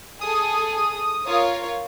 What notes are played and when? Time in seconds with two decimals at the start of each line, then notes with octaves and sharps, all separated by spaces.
0.21 G#4 A4 D#6
1.26 F4 A#4 C#5